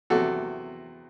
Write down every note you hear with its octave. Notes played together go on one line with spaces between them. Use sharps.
E2 C3 F#3 F#4 A4